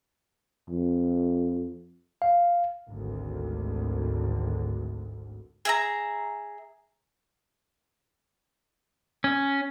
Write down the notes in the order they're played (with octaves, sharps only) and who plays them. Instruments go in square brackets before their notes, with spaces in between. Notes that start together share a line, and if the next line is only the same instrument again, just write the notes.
[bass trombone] F2
[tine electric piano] F5
[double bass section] G#1 D2
[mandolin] G#4 E5 A#5
[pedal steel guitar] C#4